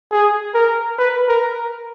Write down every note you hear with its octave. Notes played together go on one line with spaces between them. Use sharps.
G#4
A#4
B4
A#4